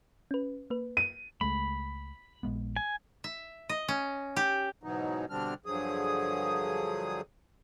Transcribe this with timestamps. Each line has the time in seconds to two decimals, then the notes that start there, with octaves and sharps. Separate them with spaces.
0.31 C#4 B4
0.70 A#3 B4
0.97 D#7
1.41 C#2 G#3 A3 B5
2.43 A#1 G#3 B3
2.76 G#5
3.24 E5
3.69 D#5
3.88 C#4
4.36 G4
4.83 G#2 B2 E3 F#3 B3 D#4
5.30 B2 D3 G3 C4 D4 F6
5.66 G2 D3 F3 F#3 G#4 D#6